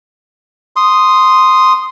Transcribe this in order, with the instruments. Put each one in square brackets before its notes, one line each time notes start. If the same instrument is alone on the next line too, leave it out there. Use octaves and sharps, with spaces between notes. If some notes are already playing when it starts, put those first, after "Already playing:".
[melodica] C6 D#6